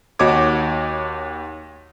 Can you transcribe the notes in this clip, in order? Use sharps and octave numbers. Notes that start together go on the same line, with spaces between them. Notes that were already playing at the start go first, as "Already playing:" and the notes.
D#2 F#4 C#5 D#5 D6 G#6